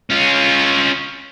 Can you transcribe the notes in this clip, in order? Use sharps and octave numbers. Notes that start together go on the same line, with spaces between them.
C#4 F4